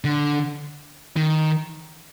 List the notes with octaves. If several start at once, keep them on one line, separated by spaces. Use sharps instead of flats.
D3
D#3